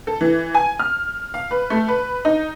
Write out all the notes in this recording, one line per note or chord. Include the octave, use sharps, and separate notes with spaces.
A4
E3
G#5
F6
F5
B4
A3
B4
D#4